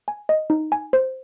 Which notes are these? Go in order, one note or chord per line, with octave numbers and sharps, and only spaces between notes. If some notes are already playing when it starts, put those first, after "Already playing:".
G#5
D#5
D#4
G#5
C5